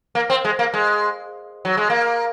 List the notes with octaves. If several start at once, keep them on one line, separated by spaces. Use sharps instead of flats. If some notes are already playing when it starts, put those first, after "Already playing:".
A#3
C4
G#3
A#3
G#3
F#3
G#3
A#3